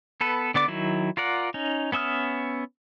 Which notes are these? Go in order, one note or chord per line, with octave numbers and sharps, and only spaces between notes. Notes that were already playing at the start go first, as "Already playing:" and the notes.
B3 A4 B4
D3 B3 D5 D6
D#3 F#3 E4
F4 A#4 D5 F#5
C#4 D#4
B3 C#4 E5 D#6 F6